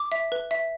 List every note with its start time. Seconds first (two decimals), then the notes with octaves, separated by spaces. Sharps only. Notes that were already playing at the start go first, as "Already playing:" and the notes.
Already playing: D6
0.12 E5
0.32 B4
0.51 E5